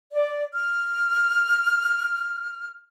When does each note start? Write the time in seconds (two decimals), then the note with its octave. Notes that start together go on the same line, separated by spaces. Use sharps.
0.12 D5
0.53 F6